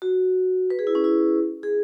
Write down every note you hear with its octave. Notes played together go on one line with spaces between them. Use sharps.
F#4
B4
G#4
E4
C#4
E4
G#4